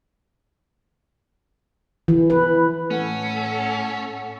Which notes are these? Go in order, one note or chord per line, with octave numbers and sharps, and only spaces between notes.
E3
B4
A2 A3 C#4 A4 F#5